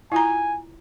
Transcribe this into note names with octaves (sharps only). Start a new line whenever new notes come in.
E4 F4 G#5 A#5